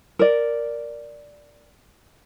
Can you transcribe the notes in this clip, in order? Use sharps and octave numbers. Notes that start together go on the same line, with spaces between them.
A#4 D5